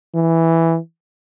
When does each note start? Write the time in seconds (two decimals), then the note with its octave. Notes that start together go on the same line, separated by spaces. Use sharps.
0.15 E3